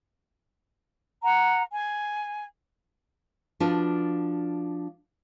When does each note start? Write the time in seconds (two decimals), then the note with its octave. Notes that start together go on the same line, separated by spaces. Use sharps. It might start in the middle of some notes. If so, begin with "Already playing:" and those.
1.23 F#5 A#5
1.73 G#5
3.60 F3 D4 F4 F#4 B4